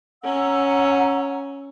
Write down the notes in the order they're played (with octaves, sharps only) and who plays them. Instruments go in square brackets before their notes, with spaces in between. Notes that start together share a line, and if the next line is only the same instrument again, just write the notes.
[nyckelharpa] C#4 [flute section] F#5 A#5 E6